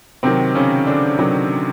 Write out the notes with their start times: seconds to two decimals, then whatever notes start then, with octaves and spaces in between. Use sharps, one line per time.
0.23 C3 D#3 F#3 C4
0.55 C#3 C#4
0.87 D3 D4
1.18 C3 D#3 F#3